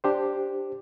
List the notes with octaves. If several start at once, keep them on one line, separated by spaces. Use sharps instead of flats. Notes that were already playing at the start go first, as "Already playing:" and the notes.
D4 G4 C5